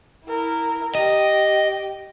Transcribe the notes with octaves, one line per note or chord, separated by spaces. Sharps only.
E4 A#4
G4 D#5